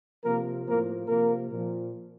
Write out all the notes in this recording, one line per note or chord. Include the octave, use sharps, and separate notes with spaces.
C3 F3 A#3 A#4
A2 F3 A#3 A#4
C3 F3 A#3 A#4
A#2 F3